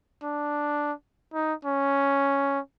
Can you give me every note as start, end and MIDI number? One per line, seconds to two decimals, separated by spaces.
0.23 0.92 62
1.34 1.54 63
1.65 2.59 61